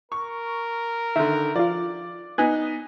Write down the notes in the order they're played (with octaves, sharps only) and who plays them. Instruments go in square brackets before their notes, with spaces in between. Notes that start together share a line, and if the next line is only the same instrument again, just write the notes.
[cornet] A#4 [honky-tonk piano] C#6
[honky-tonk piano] D3 D#3 [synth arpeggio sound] E5
[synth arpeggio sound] F3 F4 [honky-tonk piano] D5
[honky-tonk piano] B3 D#4 [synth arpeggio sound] G#5 F#6 G#6